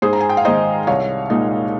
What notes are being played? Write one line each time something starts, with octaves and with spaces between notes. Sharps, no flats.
G#2 G#4 C5
A#5
G#5
G5
F5
D#3 G#3 D#4 C5 D#5
C2 C#5 F5
A#2 G#3 D#4